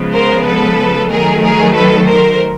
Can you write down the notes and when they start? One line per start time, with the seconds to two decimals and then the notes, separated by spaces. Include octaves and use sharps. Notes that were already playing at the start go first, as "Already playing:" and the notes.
Already playing: C#3 F3 G#3 B3
0.13 A#4 C5
0.45 A4 B4
1.10 D#3 F#3 A3 G#4 A#4
1.42 G#4 A#4
1.75 A4 B4
2.06 A#4 C5